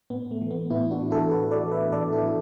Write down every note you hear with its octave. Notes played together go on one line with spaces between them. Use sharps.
A2 B3
A3
E3
B3
A2 B3 E4
D4 F#4
E3
E4 A4
A2 F#4 B4
A4 D5
E3
B4 E5
A2 A4 D5
E4 A4
E3